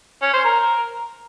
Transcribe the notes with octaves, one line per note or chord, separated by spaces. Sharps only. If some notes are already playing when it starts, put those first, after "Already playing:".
C#4
C5
A#4